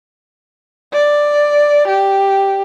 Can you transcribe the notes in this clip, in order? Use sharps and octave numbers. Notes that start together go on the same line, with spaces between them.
D5
G4